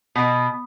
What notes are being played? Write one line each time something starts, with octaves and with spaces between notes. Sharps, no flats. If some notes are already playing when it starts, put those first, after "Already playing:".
B2